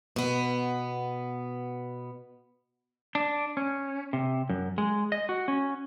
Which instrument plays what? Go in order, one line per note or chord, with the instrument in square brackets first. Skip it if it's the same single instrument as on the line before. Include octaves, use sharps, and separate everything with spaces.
[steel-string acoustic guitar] B2 B3
[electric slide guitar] D4
C#4
C3
F#2
G#3
D#5
F#4
C#4